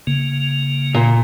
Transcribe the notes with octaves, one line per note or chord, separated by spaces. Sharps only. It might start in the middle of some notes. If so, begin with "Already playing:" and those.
C#3 A#3
A#2